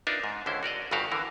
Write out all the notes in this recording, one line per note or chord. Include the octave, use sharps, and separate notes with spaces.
D4 D#4 F4 A#4 B4 E5
G#2
C#2 D3 C#4 E4 C5
F#4 A#4 D5 D#5
G1 G2 C#3 F#4 G4 F5
D3 E3 A#4